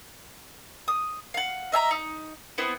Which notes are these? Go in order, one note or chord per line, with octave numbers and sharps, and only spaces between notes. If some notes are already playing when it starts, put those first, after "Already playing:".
D#6
F5 F#5
D#5 E5 G#5 A#5
D#4
B3 C4 E4